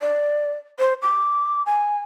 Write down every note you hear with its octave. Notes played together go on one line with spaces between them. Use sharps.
D5
C5
D6
G#5